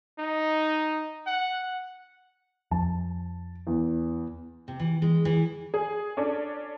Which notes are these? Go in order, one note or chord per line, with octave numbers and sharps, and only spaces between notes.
D#4
F#5
F2 F3 A5
E2
C3
E3
G#3
E3
G#4
C#4 D4 A4 D5